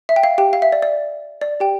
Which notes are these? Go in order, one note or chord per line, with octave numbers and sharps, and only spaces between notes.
E5
G5
F5
G4 G5
F5
E5
D5
D5
D5
G4 G5